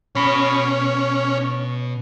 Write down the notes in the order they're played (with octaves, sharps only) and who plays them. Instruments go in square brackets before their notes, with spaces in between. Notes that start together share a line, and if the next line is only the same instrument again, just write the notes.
[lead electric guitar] B2 B5 [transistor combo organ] C#4